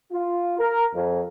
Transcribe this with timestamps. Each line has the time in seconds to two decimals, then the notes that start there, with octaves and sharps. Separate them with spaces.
0.11 F4
0.59 A#4
0.94 F2